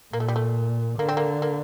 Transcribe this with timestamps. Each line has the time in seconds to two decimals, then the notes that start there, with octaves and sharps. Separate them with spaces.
0.13 A#2 A#3
0.20 A3
0.28 G3
0.36 A3
0.99 D3 A#3
1.09 C4
1.17 A#3
1.42 A#3